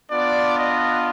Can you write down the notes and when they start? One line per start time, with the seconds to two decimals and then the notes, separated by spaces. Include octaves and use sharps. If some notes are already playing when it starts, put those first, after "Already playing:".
0.10 B3 D4 F4 D5
0.58 D#5